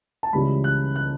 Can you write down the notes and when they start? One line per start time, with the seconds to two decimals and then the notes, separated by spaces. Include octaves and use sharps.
0.23 A5
0.33 C#2 C#3 E3 G3 B5
0.64 F#6
0.96 F#6